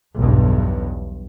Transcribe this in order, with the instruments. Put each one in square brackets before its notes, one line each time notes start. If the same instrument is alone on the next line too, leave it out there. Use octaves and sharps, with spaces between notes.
[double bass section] B1 E2 G2